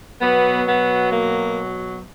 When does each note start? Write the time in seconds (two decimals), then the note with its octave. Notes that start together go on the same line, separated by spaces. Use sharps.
0.20 B2 F#3 B3
0.67 B3
1.12 A#3